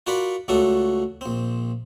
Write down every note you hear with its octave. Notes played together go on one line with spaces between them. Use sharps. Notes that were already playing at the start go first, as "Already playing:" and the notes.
F4 F#4 A#4 D5 F#5 B5
C#2 F#3 A3 D4 F#4 A4
A#1 C4